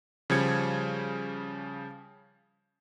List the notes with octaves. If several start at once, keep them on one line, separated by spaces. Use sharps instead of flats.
C#3 F3 G3 G#6 C#7